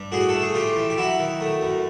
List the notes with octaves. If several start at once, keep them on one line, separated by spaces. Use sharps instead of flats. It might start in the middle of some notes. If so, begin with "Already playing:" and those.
Already playing: G2
A2 F#4 G#4
A3 A4
G#4
A2 F4 G4
E3
G4
F#3 E4 F#4
D#3
A3
F#2